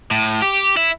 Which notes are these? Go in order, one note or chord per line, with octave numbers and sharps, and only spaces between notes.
A2
G4
E4